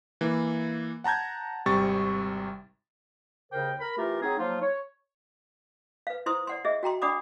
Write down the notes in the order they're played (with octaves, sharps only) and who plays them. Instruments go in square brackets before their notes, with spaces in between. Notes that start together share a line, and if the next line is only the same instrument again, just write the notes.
[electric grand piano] E3 A#3
F#5 A5 A#5 G6 G#6
G#1 C3 G3 C#6 A6
[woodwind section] D#2 C#3 A#4 C5 G5
A#4 B5
E3 A3 F4 G4 A#4
F#3 C4 D#4 G#4
F3 F#3 A#3 D#4 F4
C#5
[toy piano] B4 F5
E4 C5 C6 D#6
D5 F#5 C6
G#4 D#5 E5
F#4 G5 A#5 C6
D4 D5 F#5 B5 D6 D#6